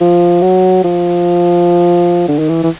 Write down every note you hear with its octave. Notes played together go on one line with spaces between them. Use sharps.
F3
F#3
F3
D3
D#3
E3
E3